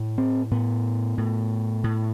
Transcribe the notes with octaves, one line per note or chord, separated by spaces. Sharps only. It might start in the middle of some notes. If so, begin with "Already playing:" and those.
Already playing: A2
C4
A2 B3
A2
A2